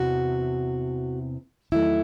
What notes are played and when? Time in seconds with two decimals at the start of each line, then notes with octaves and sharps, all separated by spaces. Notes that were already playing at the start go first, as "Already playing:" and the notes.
Already playing: E2 C3 E3 F#4
1.72 E2 D#3 F#3 A3 E4